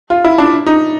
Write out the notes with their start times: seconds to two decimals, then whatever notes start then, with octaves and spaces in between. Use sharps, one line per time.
0.10 F4
0.24 E4
0.38 D4
0.66 D#4